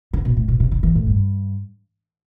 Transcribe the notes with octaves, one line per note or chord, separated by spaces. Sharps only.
D3
B2
A2
B2
C3
D3
E3
A2
G2